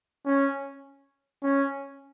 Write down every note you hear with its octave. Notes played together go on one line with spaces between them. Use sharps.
C#4
C#4